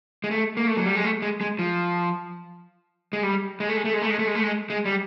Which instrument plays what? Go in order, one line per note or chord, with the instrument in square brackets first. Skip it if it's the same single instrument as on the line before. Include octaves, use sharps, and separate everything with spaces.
[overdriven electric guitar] G#3
A3
A#3
A3
F#3
G3
G#3
A3
G#3
G#3
F3
G#3
G3
G#3
A3
G#3
A3
G#3
A3
G#3
A3
G#3
A3
G#3
G#3
G3